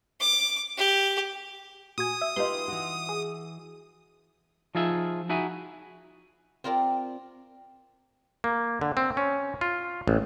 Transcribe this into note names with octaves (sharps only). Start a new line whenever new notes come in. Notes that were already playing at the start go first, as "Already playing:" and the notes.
D6
G4
A#2 F#4 G#5 D#6
E5
D#4 F4 G4 B4 C6
E3 F#4
G#4
F3 D#4 F4 G#4 E5
D#4 E4 F#4 G#4 E5 G#5
C4 F4 A#4 D5
A#3
D3
C4
C#4
F4
A1